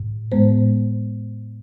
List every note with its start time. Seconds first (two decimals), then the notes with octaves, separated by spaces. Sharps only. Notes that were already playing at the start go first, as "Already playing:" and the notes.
Already playing: A2
0.32 A2 G#3 B3 C5